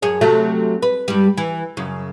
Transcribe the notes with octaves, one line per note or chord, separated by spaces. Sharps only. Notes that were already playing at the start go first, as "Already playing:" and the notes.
F#2 G#4 C#5
C3 F#3 A3
B4
G2 G3
E3
F#2 C#3